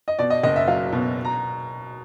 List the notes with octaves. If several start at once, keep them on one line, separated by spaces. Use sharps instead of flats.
D#5
B2 D5
D#5
F#1 D#5
E5
F#3 F5
B2
A#5